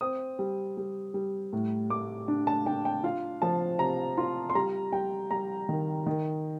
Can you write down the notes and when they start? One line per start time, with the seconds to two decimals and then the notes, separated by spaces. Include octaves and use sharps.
0.01 C4 D#6
0.39 G3
0.77 G3
1.14 G3
1.53 A2
1.90 A3 D6
2.28 D4
2.47 A5
2.66 D4 G5
2.85 G5
3.03 F4 F5
3.42 F3 A5
3.79 C3 A#5
4.17 F4 C6
4.50 C6
4.55 G3 A#5
4.93 G3 G5
5.31 G3 A#5
5.69 D#3
6.06 D#3